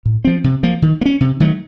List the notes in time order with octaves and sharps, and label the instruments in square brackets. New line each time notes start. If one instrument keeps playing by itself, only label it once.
[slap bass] A2
F3 C4
C3
F3 A#3
D#3
A#3
C#4
C3
D#3 F#3 A3